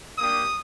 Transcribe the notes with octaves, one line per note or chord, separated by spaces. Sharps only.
A#3 D4 G4 D#6